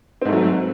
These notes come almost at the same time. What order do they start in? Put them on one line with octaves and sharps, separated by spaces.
C4 G#2 A3 F#3